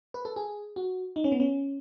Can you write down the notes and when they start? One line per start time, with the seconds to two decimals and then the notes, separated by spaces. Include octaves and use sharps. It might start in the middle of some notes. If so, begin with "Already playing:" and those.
0.14 B4
0.25 A4
0.36 G#4
0.76 F#4
1.16 D#4
1.24 C#4
1.32 B3
1.40 C#4